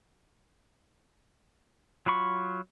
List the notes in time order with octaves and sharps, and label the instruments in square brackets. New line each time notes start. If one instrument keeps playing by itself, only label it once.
[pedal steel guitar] F#3 F4 B5 C#6